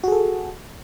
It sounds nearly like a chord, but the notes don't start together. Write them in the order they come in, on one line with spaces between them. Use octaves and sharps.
F#4 G#4 A4